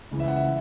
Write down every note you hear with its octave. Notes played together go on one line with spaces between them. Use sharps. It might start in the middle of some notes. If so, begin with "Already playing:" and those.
C#2 C#3 E3
E5
F#5
E5
E3